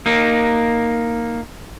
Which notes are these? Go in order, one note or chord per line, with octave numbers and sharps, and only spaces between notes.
A#3 D#4